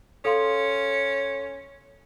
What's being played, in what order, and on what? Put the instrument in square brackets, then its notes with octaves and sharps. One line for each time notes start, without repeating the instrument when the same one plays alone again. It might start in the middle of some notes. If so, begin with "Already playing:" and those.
[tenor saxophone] C#4 [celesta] A4 F5 C6